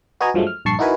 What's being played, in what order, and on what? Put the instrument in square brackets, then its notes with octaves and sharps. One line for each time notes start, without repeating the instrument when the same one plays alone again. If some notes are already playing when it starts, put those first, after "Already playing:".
[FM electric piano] F#4 B4 D#5 G#5 A#5
G2 F3 F#3 G#3 A3
F6
A#1 G2 A5 C#6 C7
D#4 E4 F#4 A#4 B4 G#5